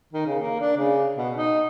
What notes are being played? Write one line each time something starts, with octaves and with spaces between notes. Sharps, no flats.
D#3
C#3
A#3
D4
C#3
B2
D#4